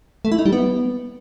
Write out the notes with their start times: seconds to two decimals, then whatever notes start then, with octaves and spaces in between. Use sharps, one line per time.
0.25 A3
0.32 E4
0.39 D#4
0.46 G3
0.53 B3